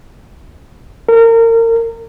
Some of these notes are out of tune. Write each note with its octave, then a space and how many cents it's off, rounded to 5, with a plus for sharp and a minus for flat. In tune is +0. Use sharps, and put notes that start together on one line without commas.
A#4 -30